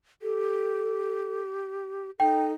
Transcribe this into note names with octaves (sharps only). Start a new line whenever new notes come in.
G4 A4
D#4 A4 G5